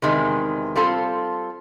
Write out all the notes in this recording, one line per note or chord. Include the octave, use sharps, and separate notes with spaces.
E2 C3 D#3 G#3
G3 C4 F4 A4